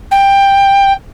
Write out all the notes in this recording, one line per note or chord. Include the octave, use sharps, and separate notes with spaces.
G5